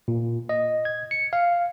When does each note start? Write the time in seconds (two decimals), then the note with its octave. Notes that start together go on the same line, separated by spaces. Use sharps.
0.08 A#2
0.49 D#5
0.85 G#6
1.11 C#7
1.33 F5